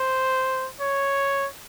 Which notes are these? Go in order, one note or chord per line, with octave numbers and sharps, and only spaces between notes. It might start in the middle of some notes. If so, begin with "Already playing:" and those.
Already playing: C5
C#5